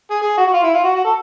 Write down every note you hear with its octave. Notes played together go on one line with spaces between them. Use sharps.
G#4
G#4
F#4
F#4
F4
E4
F4
F#4
F#4
A4